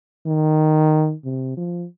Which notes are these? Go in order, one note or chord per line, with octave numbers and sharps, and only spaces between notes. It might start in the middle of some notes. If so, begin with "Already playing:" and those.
D#3
C3
F3